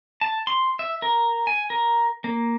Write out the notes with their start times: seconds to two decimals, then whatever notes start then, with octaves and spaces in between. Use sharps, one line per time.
0.21 A5
0.47 C6
0.79 E5
1.02 A#4
1.47 G#5
1.70 A#4
2.24 A#3